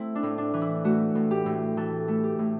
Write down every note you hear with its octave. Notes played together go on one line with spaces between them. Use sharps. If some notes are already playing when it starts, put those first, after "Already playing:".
Already playing: A3 C4 E4
D4
A2
D4
E3
E4
A3 F#4
A2
G4
A2
E3 A4
A3
G4
A2